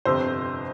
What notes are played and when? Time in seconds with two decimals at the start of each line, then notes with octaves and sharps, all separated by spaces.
0.05 G1 F2 C3 C5